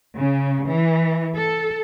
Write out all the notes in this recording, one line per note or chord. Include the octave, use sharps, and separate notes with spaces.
C#3
E3
A4